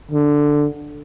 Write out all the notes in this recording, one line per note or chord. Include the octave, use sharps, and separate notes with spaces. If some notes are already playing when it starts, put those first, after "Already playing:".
D3